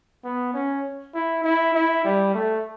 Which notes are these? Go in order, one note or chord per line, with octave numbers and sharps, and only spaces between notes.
B3
C#4
E4
E4
E4
G3
A3